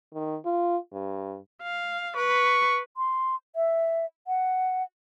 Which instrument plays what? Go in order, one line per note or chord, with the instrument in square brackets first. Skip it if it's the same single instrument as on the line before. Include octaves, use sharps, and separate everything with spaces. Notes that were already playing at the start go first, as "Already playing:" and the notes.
[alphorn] D#3
F4
G2
[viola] F5
[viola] B4 [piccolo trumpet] C#6
[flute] C6
E5
F#5